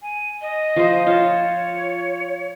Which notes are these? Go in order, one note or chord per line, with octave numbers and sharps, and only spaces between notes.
G#5
D#5
F3 C5
F4 C#5 A5